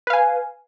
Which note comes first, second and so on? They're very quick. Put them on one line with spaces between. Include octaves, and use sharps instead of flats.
B4 F5 G#5